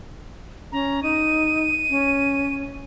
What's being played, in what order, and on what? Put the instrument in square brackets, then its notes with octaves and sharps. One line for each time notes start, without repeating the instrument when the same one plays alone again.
[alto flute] C#4 [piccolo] A#5
[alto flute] D#4 [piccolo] D#7
[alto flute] C#4